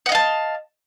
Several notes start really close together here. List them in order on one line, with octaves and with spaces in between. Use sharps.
F#5 D#5 F5 A5